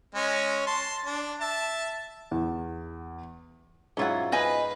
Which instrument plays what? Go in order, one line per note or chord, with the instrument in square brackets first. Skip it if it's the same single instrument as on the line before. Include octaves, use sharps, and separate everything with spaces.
[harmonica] G#3 C#4 C#5
A5 C6
D4
E5 A5
[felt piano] E2
[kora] G#2 F#3 E4 [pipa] C#4 F4 F#5
[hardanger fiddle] B4 [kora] C5 F5 [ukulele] D#5 G#5